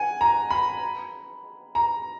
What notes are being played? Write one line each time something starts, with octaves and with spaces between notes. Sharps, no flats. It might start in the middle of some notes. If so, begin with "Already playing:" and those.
Already playing: F#5 G#5
A#5
B5
A#5